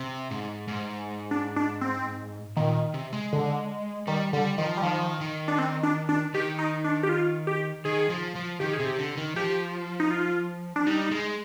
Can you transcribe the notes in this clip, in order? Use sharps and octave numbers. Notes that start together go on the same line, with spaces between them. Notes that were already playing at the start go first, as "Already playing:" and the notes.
Already playing: C3
G#2
G#2
D4
D4
C4
A#2 D#3
C3
G#3
D3
D#3 G3
D3 G3
D#3 F3
G3
D#3 F3
D#3
D4
C4
D4
D4
D#3 G4
D#4
D4
G4
F4
G4
D#3 G#4
F3
F3
D#3 G4
G#4
C3
G4
D3
D#3
F3 G4
D#4
F4
D4
G3 D#4
G#3